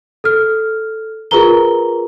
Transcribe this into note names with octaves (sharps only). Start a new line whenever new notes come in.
A4 F6
F4 G#4 A#4 B4 A#5 G7